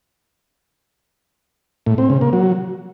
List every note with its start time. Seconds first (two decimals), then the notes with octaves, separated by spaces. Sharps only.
1.86 A2
1.98 C4
2.10 C#3
2.21 A#3
2.33 F#3